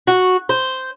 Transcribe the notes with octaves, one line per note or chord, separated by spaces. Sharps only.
F#4
C5